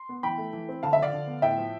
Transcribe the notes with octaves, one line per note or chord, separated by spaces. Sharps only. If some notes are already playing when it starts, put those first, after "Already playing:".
Already playing: C6
B3
E3 G5 B5
A3
E3
C4
D3 F5 A5
E5
F3 D5 F5
D3
B3
A2 E5 G5
F3